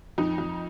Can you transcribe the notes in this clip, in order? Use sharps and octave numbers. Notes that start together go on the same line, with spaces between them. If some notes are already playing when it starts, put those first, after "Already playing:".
F2 D#4
F2